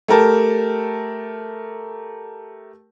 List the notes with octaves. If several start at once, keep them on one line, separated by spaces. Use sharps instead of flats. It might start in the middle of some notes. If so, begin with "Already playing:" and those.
A3 G4 A#4 A5